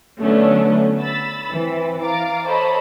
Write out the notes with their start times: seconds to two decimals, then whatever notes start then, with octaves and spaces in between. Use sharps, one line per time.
0.21 D3 F#3 A3 B3 C#4 D4
1.00 B5 E6 A6
1.52 E3 C4
2.00 F5 A#5 D6 A6
2.46 A4 C5 C#5 D#5 A5 B5